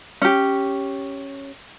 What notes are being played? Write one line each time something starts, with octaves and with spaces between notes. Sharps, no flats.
C#4 G4